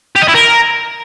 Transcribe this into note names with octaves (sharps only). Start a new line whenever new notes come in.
G4
D#5
E4
A#4